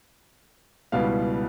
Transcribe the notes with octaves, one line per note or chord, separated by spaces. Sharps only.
C#2 B2 G3 B3 E4 F5